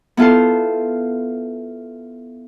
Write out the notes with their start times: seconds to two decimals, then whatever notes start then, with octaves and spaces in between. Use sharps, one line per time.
0.17 B3 E4 F4 A4 C5